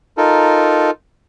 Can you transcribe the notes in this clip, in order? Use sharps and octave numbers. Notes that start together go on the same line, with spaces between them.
D#4 F4 A4 A#4